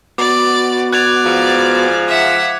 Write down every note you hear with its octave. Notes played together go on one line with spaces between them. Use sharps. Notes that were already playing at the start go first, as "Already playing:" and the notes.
B3 F#4 D5 D6
D5 F#6 G#6 F7
G#2 F3
E5 F#5